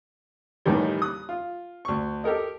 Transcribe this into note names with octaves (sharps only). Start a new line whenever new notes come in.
D#2 A2 D#3 E3 G3
D#6 F#6
F4
D2 C#6
G4 A4 A#4 D#5